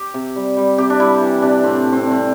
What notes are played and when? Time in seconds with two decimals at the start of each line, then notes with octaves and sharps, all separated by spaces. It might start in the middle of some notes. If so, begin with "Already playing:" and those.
Already playing: G4
0.14 C3
0.36 G3
0.57 G3
0.78 C3 G4
0.90 D4
1.00 G3 E4
1.21 E3
1.42 C3 D4
1.64 A2 C4
1.86 A2
1.92 C4
2.07 G3 C4